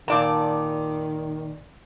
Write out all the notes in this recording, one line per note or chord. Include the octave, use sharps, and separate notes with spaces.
A#2 D#3 D5 A5